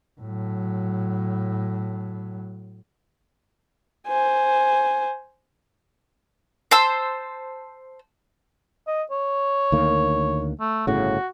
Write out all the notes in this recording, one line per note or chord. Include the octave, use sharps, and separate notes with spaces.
A2 F#3
C5 G#5
C5 A5 E6
D#5
C#5
D2 D#3 A#3
A3
G1 A2 C#3 F#4